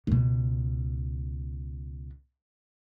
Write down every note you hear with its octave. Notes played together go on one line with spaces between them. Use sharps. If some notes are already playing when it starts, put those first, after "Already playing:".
C#2 B2